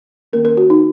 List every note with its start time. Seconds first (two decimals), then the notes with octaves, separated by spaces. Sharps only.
0.33 D#3 A#3 C#4 A#4
0.45 A#4
0.57 F#4
0.70 D#4